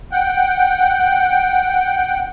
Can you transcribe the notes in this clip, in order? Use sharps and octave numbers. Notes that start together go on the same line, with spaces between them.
F#5 G5